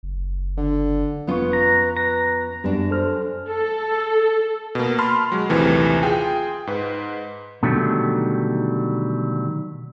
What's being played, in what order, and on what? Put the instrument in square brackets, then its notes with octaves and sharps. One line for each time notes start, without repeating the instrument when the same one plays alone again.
[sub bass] F#1
[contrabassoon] D3
[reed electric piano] F2 C#6 [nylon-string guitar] B3 C#4 F4 [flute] B4
[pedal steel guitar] A#5
A#5
[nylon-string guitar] F#2 D4 [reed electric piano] G3 B3
[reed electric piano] A4 C5 F6
[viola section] A4
[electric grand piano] B2 A#3
A5 B5 C6 F6
F#3 G#3
A#1 D#2 C3 E3 A3
F4 G#4 G5
G#2 B4
[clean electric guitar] B2 D3 D#3 F#3 G3 A3